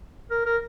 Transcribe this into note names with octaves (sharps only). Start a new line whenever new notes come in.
A#4
A#4